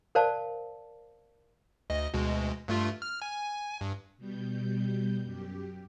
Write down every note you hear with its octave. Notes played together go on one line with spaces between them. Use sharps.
A#4 C5 D5 F5 A5
D2 D#5
D2 B2 G#3
G2 A3 F4
F6
G#5
G2
B2 G3 G6
F#2 G4